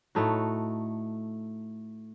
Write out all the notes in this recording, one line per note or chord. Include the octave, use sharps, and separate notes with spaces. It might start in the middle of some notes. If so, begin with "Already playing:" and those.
A2 A3 D#4 F#4